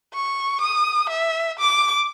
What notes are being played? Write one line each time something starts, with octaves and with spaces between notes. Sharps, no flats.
C#6
D#6
E5
D6